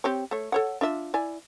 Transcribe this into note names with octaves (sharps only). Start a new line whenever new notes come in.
C4 G4 C#5
A3 C#5
A4 C#5 F#5
D4 F4 E5
E4 D5 G#5